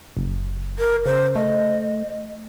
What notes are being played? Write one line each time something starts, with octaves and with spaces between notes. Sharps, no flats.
F#1
A#4
C#3 C5
A3 D#5